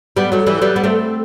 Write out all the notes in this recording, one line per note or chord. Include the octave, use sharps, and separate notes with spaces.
G3 B3
F#3 A3
E3 G3
G3 B3
B3
A3 C4